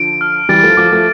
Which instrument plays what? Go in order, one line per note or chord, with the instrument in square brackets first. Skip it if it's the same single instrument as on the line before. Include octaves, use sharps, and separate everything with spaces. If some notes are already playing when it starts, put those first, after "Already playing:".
Already playing: [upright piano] D3 F3 [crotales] D7
[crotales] F6
[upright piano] E3 G3 [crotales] A6
[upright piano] F3 A3
[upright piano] F3 A3 [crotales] D6
[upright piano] F3 A3